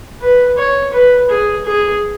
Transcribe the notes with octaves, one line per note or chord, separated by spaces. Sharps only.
B4
C#5
B4
G#4
G#4